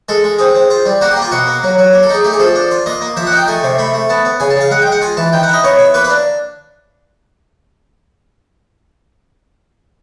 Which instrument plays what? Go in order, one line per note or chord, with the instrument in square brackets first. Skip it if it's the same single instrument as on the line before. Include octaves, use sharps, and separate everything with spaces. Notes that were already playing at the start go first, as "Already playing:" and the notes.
[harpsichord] G#3 A4
G#3
C4 G#4
C4
F4
G3
A#3 F#4
G4
A#3
F4
B2 F#4
A#3
F#3
F#3
A#3
A4
D#4 G#4
A3 G4
G#4
F3 A4
D4
F4
A#3 D#5
A#3
F3 E5
F#5
D#4 G5
A3 G#5
C3
A3 B5
A3
B3 A5
B3
C#3 G#5
A5
C#3 F5
G#3 F#5
G5
G#3
F#5
F4 G#5
E3 A5
D#3 G5
F#5
E4 D#5
B3 C#5
E4
A#3 B4
B4
D4